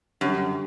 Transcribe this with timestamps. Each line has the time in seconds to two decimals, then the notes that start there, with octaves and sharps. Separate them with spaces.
0.21 F#2 D3 G3 D4